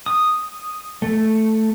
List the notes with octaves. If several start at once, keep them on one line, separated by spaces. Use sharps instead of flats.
D#6
A3